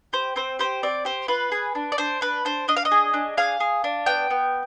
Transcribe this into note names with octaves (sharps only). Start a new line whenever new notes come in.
G4 C5
C4 C5
G4 C5
C4 D5
G4 C5
F4 B4
G#4
D4
D5
D4 C5
D4 B4
D4 C5
D4 D#5
F5
D#5
G#4
D4
G#4 F5
G#4
D4
B3 G5
B3